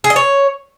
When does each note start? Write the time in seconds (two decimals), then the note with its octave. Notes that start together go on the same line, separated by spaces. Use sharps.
0.04 G#4
0.10 D#5
0.16 C#5